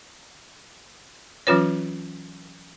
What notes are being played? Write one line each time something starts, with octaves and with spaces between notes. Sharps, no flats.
E3 F#3 C#4 F4 B4 C#5